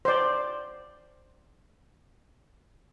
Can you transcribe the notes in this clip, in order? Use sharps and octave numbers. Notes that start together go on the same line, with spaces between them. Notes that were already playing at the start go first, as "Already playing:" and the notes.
C5 D5